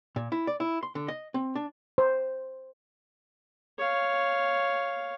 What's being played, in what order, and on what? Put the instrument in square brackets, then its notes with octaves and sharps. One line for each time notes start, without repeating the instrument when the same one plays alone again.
[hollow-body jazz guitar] A#2
E4
D5
E4
C6
D3
D#5
C4
D4
[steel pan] C5
[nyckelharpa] C#5 F5